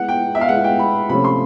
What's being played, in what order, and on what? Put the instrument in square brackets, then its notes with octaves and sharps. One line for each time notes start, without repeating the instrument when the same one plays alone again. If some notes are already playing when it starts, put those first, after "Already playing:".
Already playing: [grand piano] G#3 B3 E4 [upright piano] F#5
[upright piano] G5
E5
F5
[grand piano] G#3 B3 E4 [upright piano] F#5
[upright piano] G5
B5
[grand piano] C3 F3 A3 C#4 [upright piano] B5
[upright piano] C6